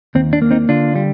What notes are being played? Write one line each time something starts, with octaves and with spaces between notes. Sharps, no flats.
D#2 C4
D4
A#3
C4 D#4
D3 D4 F4
G3